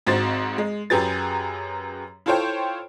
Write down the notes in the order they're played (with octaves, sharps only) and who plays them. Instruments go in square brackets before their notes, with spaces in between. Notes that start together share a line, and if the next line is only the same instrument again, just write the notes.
[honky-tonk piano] G#1 G#2 C4 F#4 C5 A6
G#3
F#2 F#3 G4 G#4 B4 A6
E4 F4 A4 C5 C#5 G5